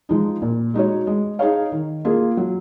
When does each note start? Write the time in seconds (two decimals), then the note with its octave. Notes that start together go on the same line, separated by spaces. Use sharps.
0.09 F3 G#3 D#4
0.42 A#2
0.74 G#3 D#4 F#4 C#5
1.07 G#3
1.39 D#4 G#4 C#5 F5
1.72 D#3
2.05 A#3 F4 G#4
2.37 F#3